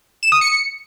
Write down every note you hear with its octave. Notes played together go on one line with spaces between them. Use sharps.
E7
D#6
C#7